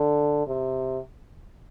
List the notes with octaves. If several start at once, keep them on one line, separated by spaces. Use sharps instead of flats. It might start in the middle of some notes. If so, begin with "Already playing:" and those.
Already playing: D3
C3